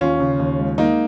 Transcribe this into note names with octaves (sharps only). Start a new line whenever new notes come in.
D#2 C#4 F4
C#3
D#2
G#3
G#3 A#3 D#4